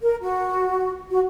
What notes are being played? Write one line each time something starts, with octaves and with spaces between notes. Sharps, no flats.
A#4
F#4
F#4